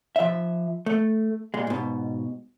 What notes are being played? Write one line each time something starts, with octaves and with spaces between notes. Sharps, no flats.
F3 E5
A3
A#2 G#3
G#2 B2